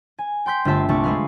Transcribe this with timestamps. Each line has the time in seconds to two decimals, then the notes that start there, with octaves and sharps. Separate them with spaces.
0.19 G#5
0.46 G5 C6 G6 B6
0.65 G1 A3 F4 E5 A5
0.88 G1 C2 A3 A5 C#6 D6
1.04 G#3 A3 G#4 B4 F5